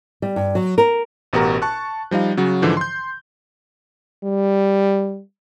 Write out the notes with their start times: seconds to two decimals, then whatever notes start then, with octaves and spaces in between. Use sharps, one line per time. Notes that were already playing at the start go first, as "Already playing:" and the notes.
0.22 G3
0.36 G2
0.55 F#3
0.78 A#4
1.33 A1 B2 F#4 G4 A#4 A#5
1.62 A5 C#6 F#6
2.11 F3 G3 D#4 F5
2.37 C#3 F#3 F#4
2.62 G#2 D3 E3 F3
2.77 C6 G6
4.24 G3